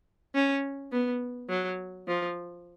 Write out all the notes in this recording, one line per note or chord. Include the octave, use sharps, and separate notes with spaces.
C#4
B3
F#3
F3